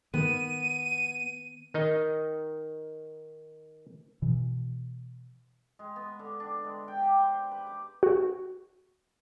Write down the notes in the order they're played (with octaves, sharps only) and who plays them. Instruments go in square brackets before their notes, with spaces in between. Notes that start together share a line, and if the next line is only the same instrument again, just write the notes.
[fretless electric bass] D#3 [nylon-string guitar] B3 [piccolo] D#7
[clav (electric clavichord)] D#3 D#4 D#5
[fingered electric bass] B2 E3
[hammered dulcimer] G#3
B3
D3
D4
G#3
G5
G4
C5
B4
D6
[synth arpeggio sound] F#4